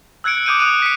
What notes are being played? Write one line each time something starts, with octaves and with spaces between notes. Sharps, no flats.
E6 F#6 G#6 C#7 D7
D6 D#6 G6 C#7 D#7
D#6 F#6 D#7 F7
B6 C#7